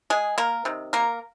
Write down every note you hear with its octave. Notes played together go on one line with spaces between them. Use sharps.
G#3 G#4
A#3 A#4
C3 D#3
A#3 A#4